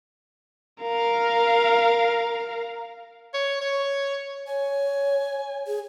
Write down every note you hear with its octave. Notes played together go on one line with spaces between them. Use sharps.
A#4 F5
C#5
C#5
C#5 G#5
G#4